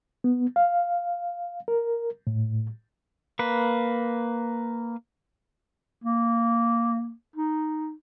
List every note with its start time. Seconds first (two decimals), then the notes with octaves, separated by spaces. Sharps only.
0.24 B3
0.56 F5
1.68 A#4
2.27 A2
3.39 A#3 B4
6.04 A#3
7.36 D#4